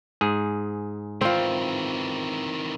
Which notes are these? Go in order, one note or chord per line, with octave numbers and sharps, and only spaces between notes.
G#2 G#4
D#3 E3 C4 F4